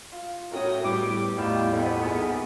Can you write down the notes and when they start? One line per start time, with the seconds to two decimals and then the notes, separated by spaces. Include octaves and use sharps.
0.12 F4
0.51 F#2 A2 C#4 F#4 A#4 G5 D#6
0.83 A2 G3 B3 G4 D6
1.36 E2 A2 G3 A3 D#4 F4 G4 E7
1.72 F2 B3
2.05 A#1 D#4 G#4 A#4